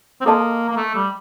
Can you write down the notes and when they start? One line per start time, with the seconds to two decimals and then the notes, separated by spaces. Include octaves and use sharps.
0.21 C4
0.26 A#3 A4 D#5 A5 C6
0.69 A#3
0.77 A3
0.95 G3